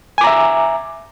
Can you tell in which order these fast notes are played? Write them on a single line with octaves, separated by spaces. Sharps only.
G#5 D6 A#5 E5